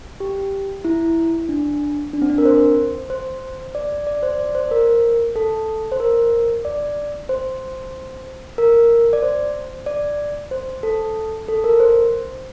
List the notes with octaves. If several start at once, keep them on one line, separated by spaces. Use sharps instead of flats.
G4
E4
D4
D4
C4
D4
A#4
C5
C5
D5
D5
C5
D5
C5
A#4
A4
C5
A#4
D5
C5
A#4
D5
C5
D5
C5
A4
A4
A#4
C5